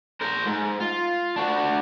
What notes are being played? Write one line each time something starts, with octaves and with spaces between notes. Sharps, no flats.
A#4 C5
G#2
F4
D4 F#4